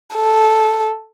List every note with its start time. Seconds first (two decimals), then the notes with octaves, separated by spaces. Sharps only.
0.15 A4